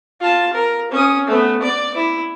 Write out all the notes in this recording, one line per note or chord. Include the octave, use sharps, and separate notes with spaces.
F4 A5
A#4
C#4 D#6
A3 B3
D5 D6
E4